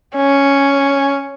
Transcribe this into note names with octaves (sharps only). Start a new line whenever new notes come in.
C#4